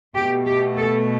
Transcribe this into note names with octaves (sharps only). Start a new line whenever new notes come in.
B2 A3 G4
G4
A4